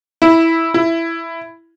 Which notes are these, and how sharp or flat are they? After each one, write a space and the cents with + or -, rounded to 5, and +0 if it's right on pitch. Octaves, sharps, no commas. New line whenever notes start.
E4 -5
E4 +10